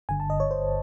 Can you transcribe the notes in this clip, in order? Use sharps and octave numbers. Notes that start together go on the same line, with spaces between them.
G1 G2 D3 G#5
A5
D#5
C#5
C5